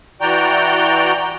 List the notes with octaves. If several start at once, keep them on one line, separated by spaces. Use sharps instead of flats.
E3 F#4 D5 G5 A#5 G6